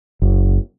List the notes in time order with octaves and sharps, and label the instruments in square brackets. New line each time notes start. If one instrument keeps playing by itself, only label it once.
[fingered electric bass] F#1